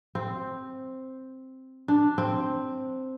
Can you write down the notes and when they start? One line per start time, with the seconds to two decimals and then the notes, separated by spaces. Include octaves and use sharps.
0.15 C4
1.88 D4
2.18 C4